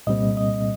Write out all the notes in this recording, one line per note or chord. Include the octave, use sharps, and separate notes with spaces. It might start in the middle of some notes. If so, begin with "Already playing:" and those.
C2 A#2 G3 C4 D#5
D#5